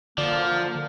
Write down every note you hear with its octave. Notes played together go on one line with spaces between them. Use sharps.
D3 F3 A#3 D5